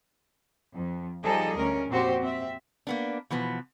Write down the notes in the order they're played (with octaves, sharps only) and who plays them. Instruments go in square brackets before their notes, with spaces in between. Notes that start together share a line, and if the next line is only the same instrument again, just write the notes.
[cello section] F2
F3 G3 D#4 G#4 A4 D#5
D2 C#4 A#4
F2 A#2 C4 F#4 G4 C5
C4 E5
[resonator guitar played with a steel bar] A#3 B3 D4
B2 E3 F3 B3